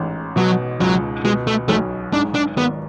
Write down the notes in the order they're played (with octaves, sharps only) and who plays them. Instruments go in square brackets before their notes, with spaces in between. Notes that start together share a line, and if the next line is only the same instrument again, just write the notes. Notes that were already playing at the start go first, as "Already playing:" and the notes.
Already playing: [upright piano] A1 G#2
[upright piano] B2 [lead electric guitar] F#3
[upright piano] C#2 [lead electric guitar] F#3
[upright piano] B2 [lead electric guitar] G#3
[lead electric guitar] A3
[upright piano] B1 [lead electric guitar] A3
[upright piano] G#2 [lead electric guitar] D4
[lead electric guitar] D4
[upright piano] G#1 [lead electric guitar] B3